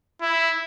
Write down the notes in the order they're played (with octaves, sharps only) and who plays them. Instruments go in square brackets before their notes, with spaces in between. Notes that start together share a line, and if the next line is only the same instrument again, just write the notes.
[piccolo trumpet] E4